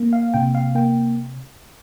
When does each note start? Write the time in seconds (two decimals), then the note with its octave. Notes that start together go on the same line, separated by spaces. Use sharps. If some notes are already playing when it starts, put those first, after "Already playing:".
Already playing: A#3
0.13 F5
0.34 C3 G5
0.55 F5
0.75 A#3 G5